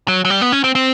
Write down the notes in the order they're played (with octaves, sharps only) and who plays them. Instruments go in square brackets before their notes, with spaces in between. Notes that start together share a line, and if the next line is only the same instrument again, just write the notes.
[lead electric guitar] F#3
F#3
G3
B3
C#4
C4
C4